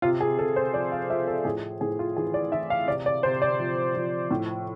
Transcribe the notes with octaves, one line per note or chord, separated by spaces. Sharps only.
C3 F4
G#4
C3 A4
C5
F3 D5
F5
F3 E5
A4
A2 G#4
A2 G#4
F4
E3 G#4
D5
E3 E5
F5
C3 D5
D5
C3 C5
D5
F3
F3
A2